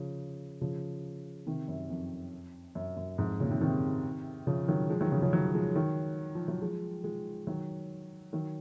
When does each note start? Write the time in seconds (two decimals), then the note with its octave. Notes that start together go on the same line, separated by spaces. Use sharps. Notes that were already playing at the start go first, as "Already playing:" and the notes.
Already playing: C#3 F3
0.61 C#3 F3
1.47 C3 D#3
1.68 F#2
1.90 F2
2.75 F#2
2.97 F#2
3.18 F2 G#2
3.40 A#2 C#3
3.51 C3 D#3
3.61 C3 D#3
4.47 C#3 F3
4.68 D#3 F#3
4.90 F3 G#3
5.01 D#3 F#3
5.12 C#3 F3
5.22 C#3 F3
5.33 D#3 F#3
5.55 F3 G#3
5.75 D#3 F#3
6.35 F3
6.48 F#3
6.61 F3 G#3
7.04 F3 G#3
7.47 D#3 F#3
8.33 D#3 F#3